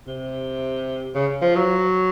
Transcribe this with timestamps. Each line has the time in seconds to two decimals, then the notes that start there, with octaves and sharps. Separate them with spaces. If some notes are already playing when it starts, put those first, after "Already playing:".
0.07 C3
1.15 C#3
1.42 F3
1.56 F#3